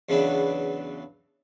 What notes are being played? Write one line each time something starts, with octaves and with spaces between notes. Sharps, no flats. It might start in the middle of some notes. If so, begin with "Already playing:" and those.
E2 C#3 E3 F#3 B3 D4